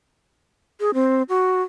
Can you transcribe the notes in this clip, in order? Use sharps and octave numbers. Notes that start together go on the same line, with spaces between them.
G#4
C4
F#4